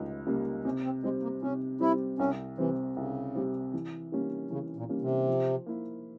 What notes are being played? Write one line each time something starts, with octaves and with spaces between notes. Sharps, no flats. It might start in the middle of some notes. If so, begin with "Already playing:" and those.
Already playing: C#2 G3
C#3 G3 A#3
C3 C#4
C4
G3 G#3 C4
A#3
C3 C#4
G3 C4 E4
C2 C#4
C3 E3 G3 C4
C2 C#3
C3 G3 C4
E3
G3 A#3 C#4
C#3 E3
A#2
G3 A#3 C#4
C3
F3
A#3 E4